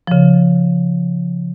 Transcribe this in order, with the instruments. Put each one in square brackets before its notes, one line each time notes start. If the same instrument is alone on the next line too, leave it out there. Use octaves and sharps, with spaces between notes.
[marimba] C#3 F3